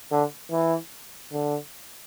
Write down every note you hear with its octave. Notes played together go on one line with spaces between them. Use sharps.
D3
E3
D3